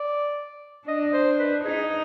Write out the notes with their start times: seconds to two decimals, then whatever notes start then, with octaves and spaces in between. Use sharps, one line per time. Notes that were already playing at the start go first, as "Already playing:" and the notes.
Already playing: D5
0.88 D4 D#5
1.13 C5
1.39 B4
1.64 D#4 G#4